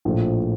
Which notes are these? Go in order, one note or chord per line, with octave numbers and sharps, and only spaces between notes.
A#1 A2 F3